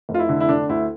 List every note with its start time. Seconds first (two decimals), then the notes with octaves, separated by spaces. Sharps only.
0.09 F1
0.14 F4
0.19 E4
0.29 D3
0.40 E4
0.49 D3 D4
0.69 D2 E4